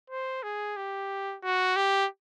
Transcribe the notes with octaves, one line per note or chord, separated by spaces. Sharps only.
C5
G#4
G4
F#4
G4